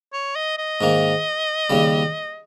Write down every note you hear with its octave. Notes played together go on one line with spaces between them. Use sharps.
C#5
D#5
D#5
G#2 D#3 A#3
D#2 C#3 G3